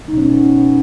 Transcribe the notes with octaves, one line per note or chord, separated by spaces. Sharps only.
B2 B3 C#4 D#4